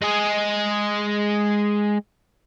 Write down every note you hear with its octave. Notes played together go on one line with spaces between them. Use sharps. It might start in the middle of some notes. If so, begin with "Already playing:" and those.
G#3 G#4